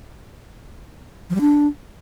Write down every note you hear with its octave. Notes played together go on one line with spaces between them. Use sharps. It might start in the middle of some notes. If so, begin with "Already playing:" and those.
F3
G3
D4